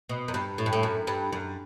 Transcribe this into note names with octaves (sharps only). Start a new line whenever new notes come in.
B2
F#2
G2
A2
G2
A2
F#2
G2
F#2